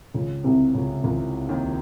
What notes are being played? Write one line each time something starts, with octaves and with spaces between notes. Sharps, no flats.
C#2 C#3
C2 C3
C#2 C#3
C#2 C#3
D#2 D#3